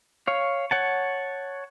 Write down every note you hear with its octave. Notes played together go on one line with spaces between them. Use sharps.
C#5 F5
C#5 F#5 A5